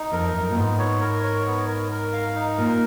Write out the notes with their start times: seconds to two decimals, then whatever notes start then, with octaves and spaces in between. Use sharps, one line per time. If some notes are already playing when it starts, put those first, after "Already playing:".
Already playing: D#4
0.12 F2 A#4
0.34 F#2 D#4
0.50 A#2
0.56 G#2 B3
0.79 C#5
1.01 A#4
1.23 C#5
1.46 B3
1.68 A#4
1.90 A#4
2.13 F5
2.35 D#4
2.58 A#2 A#4